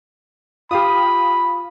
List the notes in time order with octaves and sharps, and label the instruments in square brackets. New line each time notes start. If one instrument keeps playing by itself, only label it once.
[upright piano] F4 [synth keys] G4 F5 D#6 [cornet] B5